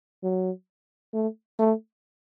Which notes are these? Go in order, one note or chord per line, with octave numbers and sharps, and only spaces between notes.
F#3
A3
A3